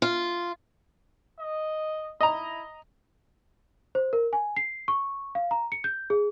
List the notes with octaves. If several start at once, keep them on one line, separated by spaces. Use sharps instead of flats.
F4
D#5
E4 D#5 A#5
C5
A#4
G#5
C7
C#6
F5
A#5
C#7
G6
G#4